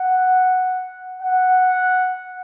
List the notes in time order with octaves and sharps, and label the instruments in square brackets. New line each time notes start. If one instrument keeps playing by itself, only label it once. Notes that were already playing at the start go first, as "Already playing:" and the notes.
Already playing: [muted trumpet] F#5
F#5